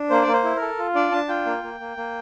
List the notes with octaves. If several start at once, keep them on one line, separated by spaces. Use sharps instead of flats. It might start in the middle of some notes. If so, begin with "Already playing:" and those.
Already playing: D4
A#3 C5
A#3 D5
C5
E4
A#4
A4
F4
D4 D5
D4 A5
F4 G5
A#3
A#3
A#3
A#3